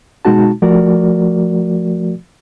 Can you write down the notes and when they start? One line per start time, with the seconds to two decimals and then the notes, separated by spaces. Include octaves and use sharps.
0.25 B2 G#3 D#4 F#4 A5
0.62 F3 A3 F#4 A#4 D5